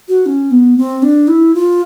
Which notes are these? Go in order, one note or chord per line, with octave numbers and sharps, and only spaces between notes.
F#4
C#4
B3
C4
D4
E4
F4